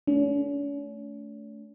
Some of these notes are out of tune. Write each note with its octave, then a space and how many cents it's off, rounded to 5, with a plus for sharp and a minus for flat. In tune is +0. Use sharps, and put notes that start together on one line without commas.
A3 -10 C#4 +45